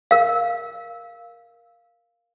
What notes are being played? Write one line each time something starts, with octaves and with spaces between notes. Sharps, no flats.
A#4 F5